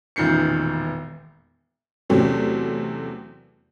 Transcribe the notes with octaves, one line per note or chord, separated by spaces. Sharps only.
E1 A1 A#2 D#3 C7 C#7
E2 C3 F#3 A3 C#4